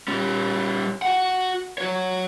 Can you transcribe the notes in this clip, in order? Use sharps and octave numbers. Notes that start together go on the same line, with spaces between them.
G3 C#4
F#4 F#5
F#4 C#5